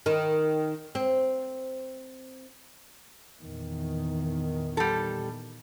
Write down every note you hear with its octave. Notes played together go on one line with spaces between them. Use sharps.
D#3
C4
E2 A#2 D#3
G3 A4